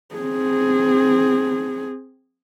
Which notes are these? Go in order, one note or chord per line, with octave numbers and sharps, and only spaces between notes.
C4 G#4